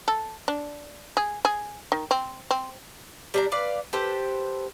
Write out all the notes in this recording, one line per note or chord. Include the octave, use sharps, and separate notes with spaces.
A4
D4
G#4
G#4
D#3
C4
C4
G3 D4 A#5
B4 D5 F5
G4 A4 B4 C5